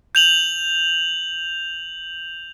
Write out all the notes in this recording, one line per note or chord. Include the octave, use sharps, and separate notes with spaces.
G6 F7 F#7